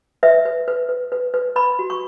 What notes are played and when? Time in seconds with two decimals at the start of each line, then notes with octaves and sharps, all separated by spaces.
0.23 B4 E5
0.45 B4
0.68 B4
0.89 B4
1.12 B4
1.34 B4
1.56 B4 B5
1.79 F#4
1.90 C#6